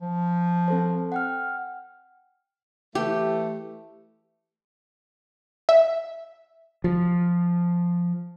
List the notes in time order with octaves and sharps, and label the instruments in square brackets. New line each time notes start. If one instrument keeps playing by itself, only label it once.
[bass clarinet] F3
[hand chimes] C4 A4 C5
F#5 G5 F6
[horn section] E3 A3 [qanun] G4
[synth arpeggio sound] E5
[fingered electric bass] F3